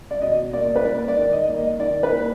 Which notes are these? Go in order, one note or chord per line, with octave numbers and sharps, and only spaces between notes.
D5
B2 D#5
A#3 D5
B4
A#3 D5
D5
D#3
D#5
A#3
D#5
D#3 D5
B4
A#3